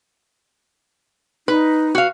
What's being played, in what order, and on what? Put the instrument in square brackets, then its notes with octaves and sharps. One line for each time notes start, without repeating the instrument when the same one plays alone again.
[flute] D#4 [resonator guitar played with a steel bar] B4
[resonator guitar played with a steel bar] F#4 F5